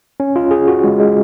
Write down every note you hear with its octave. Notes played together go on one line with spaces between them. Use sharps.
C#4
F4
G#4
F#4
G#3
G#3